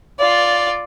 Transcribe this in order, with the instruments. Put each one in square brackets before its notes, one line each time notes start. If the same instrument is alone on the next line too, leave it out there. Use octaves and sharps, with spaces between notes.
[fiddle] F4 D5